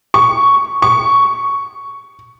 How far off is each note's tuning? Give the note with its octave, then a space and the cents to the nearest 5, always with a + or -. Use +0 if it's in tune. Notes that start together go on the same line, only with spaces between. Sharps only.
C#6 +5
C#6 +5